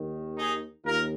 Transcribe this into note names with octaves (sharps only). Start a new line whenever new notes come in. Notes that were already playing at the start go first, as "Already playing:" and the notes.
Already playing: D#2 D#3
D#4 G#4
D#2 F4 A#4